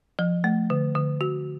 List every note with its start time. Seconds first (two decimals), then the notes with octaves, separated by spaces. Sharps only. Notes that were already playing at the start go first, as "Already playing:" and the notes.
0.19 F3
0.44 A3
0.70 D3
0.95 D3
1.21 F#4